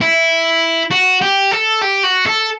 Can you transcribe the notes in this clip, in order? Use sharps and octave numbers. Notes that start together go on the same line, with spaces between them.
E4
F#4
G4
A4
G4
F#4
A4